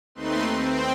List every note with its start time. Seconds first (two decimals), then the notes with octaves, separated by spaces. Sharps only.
0.15 D#2 A3 C4 D#4 B4 C6
0.58 C4 G5